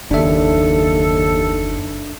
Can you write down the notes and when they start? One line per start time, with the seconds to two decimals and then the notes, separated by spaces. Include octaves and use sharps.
0.11 F#1 D#2 D4 A4 E5